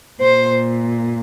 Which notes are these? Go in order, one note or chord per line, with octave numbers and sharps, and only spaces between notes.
A#2 C5